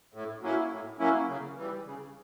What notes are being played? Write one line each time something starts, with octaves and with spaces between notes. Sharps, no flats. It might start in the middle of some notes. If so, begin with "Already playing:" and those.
A2
F#3 A#3 C#4 E4
A2
F#3 A#3 C#4 E4
C#3
E3 G3
C#3